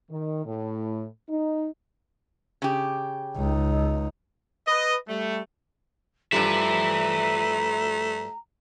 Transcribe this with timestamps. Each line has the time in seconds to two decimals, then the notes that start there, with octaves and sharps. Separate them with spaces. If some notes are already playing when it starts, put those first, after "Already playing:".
0.10 D#3
0.45 A2
1.29 D#4
2.62 C#3 G4
3.36 C#2 D#4
4.68 B4 D#5
5.09 G3 A3
6.32 G2 F3 G3 A3 B4 E5 A#5